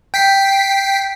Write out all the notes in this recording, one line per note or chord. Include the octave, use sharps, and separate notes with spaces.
G5 B6 C7